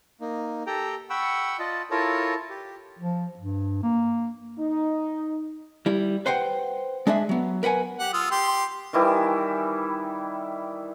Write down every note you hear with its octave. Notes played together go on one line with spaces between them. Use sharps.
A#3 D#4
G4 A4 G5 A#5
F#5 G5 B5 C#6 E6
F4 D5 D#5 A5
E4 F4 A4 A#4 C#5 A5
G4
F3
G2
A#3
D#4
G3 E4
B4 C5 F#5 G5
G#3 D4 G#4 E5
F#3 B3
A#4 B4 F#5 G#5
G4 F#5
F4 D#6 E6
G4 G5 C6
D#3 E3 G3 E4